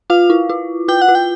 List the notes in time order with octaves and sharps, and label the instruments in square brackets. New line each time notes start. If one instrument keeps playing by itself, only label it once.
[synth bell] F4 [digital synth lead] F5
[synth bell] E4
F4
[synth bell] F4 [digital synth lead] G5
[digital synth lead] F#5
[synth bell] F4
[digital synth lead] G5